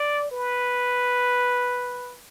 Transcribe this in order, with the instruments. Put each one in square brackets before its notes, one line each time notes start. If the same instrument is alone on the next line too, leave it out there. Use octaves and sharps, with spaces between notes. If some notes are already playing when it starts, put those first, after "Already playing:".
Already playing: [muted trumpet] D5
B4